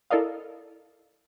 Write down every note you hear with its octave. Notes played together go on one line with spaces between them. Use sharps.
E4 A4 A#4 D5 D#5 F5